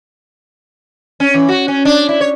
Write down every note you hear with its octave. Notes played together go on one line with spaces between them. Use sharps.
C#4
E3
F#4
C#4
D4
E4
C#5